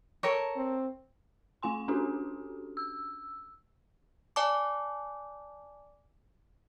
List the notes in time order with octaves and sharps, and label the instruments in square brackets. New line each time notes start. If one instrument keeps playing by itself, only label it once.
[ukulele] A4 A#4 C#5
[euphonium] C4
[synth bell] A3 F4 G#5 C6
C#4 D4 F#4 G4 A4
E6
[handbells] D5 G#5 A5 D6